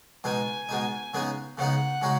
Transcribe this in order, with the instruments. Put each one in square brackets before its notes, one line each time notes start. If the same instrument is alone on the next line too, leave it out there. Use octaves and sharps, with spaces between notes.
[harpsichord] B2 G#3 D#4 [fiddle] G#5
[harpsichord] B2 G#3 D#4
C#3 G#3 B3 D#4
[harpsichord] C#3 G#3 B3 D#4 [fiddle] F#5
[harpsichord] C#3 G#3 D#4 F#4